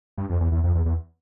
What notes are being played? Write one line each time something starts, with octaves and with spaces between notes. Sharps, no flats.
G2
F2
E2
E2
F2
E2
E2